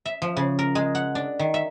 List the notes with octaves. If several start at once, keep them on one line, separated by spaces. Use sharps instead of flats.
E5
F3
C#3
A#4
G#3
F#5
D4
D#3
E5